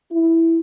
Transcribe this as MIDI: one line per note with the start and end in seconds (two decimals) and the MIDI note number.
0.11 0.59 64